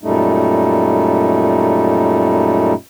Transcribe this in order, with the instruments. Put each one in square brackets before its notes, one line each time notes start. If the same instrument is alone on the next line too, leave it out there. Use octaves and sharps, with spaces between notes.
[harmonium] F#2 A#2 G3 A3 D#4